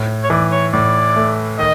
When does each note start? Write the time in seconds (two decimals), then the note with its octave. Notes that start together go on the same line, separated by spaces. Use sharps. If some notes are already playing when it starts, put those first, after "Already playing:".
Already playing: A2
0.23 C#5
0.30 E3 D5
0.51 C#5
0.73 A2 D5
1.16 A3
1.59 D#3 D#5